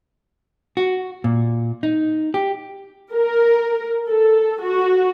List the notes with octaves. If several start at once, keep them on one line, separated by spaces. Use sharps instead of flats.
F#4
A#2
D#4
G4
A#4
A4
F#4